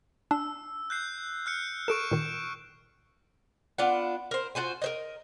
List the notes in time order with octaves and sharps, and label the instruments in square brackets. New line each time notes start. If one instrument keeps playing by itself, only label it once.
[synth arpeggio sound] D4 [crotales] E6
[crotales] F#6 G6 C7
F6 F#6 C#7
[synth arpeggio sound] A4 A#4 [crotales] C#6 D7 E7
[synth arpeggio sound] A#2 D#3
[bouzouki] B3 D4 F4 F#5
A#4 C5
F4 F#4 C5 G#5
A#4 C5 D#5